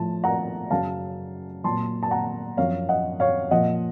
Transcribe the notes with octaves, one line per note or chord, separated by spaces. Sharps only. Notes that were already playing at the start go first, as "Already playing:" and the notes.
Already playing: A2 F3 A5
F#5 A#5
F#2 C#3 F#3 F5 A5
A#2 F#3 A5 C6
A5
F#5 A#5
F#2 F3 C#5 F5
D#5 F#5
C#5 F5
A#2 F3 D#5 F#5